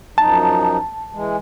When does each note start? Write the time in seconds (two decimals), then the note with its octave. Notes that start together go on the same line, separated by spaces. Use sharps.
0.18 F#2 F3 D#4 A5
1.13 E3 G#3